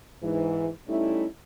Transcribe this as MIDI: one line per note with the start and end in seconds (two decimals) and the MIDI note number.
0.22 0.68 44
0.22 0.68 52
0.88 1.25 55
0.88 1.25 57
0.88 1.25 61
0.88 1.25 63
0.88 1.25 64